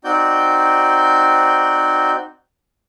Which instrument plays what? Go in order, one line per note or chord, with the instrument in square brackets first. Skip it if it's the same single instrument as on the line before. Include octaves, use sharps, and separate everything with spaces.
[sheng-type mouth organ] C4 D#4 F#4 D5 G6